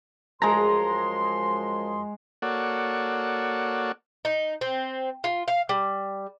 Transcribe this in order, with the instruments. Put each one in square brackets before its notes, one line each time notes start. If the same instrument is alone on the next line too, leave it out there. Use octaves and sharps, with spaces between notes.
[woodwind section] F#2 F3 C6 [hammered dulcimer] G#3 A#5
[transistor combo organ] A#3 F#4 A4 C#5 D5 F#5
[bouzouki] D#4
C4
F4
F5
G3